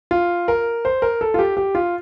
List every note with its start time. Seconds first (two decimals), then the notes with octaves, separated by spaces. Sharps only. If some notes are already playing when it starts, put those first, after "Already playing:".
0.11 F4
0.48 A#4
0.85 C5
1.02 A#4
1.21 A4
1.34 F4
1.39 G4
1.57 G4
1.75 F4